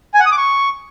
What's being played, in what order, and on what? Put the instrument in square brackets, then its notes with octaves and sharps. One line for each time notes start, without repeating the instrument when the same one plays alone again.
[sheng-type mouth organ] G#5
F#5
D#6
D6
C#6